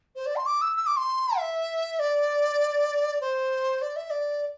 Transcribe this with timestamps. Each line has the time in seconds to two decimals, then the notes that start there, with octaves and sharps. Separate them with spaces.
0.16 C5
0.26 D5
0.36 C6
0.46 D6
0.62 E6
0.76 E6
0.87 D6
0.97 C6
1.38 E5
1.99 D5
3.21 C5
3.82 D5
3.96 E5
4.10 D5